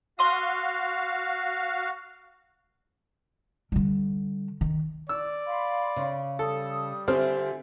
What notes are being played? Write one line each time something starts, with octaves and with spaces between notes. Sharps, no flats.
F#4 F5 C6 D#6
D3 G3
D#3
D5 E6
F5 B5 C6
C#3
G3 A4 D#6
D3 C4 F4 G4 C5 E5 G#5 F6